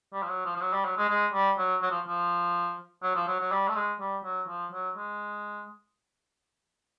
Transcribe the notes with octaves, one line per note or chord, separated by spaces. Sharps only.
G3
F3
F#3
F3
F3
F#3
G3
F#3
G#3
G#3
G3
F#3
F#3
F3
F3
F#3
F3
F#3
F#3
G3
A3
G#3
G3
F#3
F3
F#3
G#3